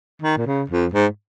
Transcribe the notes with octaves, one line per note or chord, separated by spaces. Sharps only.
D#3
A#2
C#3
F2
G#2